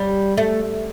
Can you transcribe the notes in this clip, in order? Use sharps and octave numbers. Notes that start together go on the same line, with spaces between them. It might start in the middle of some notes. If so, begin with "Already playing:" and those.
Already playing: G3
A3